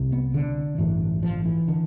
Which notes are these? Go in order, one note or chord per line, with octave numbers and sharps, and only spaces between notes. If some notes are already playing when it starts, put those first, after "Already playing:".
Already playing: C2 C3
B3
D3
A1 G2 D3 E3
F3
E3
D3